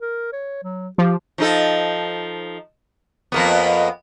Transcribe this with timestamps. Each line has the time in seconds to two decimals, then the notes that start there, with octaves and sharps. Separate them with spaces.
0.01 A#4
0.32 C#5
0.63 F#3
0.98 F3 G4
1.38 F3 D#4 A4
3.32 F2 A#3 B3